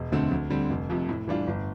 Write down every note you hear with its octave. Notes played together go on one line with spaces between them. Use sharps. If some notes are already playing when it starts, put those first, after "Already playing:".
Already playing: E1
D2 D3 A3 C4
D2
D3 G3 C4
F1
F2 C3 F3
A2
E3 G3 D4 F4
G1